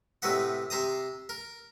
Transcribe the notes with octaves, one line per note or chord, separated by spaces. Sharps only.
A2 C3 A3 B4 D#5 F#5
C3 C5 A#5 D#6
A#4